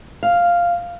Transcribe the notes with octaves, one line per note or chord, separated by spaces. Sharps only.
F5